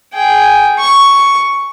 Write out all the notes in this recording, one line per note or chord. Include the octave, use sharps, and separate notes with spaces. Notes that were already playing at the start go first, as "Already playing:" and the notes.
G#4 G5
C#6